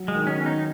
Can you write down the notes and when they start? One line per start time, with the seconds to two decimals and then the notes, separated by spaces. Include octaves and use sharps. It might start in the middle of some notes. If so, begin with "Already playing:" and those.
Already playing: F#3
0.08 G#3
0.14 D#3
0.27 C#4
0.40 B3
0.46 D#4